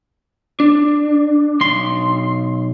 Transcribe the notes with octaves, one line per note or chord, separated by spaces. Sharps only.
D4
B1 C6